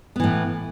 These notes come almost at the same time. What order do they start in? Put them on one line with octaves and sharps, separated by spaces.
B3 E3 A2